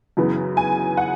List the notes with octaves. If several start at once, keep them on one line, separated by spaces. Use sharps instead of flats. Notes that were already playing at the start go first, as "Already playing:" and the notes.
F#2 C#3 E3 B3
G#5
F#5